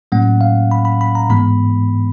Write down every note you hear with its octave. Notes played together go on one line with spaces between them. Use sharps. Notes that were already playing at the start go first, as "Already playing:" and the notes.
A2 F#3 A#3 C#4 F#5
F5
B5
B5
B5
A#5
G#2 E3 G#3 B3 B5